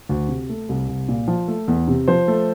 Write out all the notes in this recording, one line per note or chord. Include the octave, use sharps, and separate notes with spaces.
D2
C3
A3
C2
C2
A#2
F3
A3
E2
C3
F3 C5
A3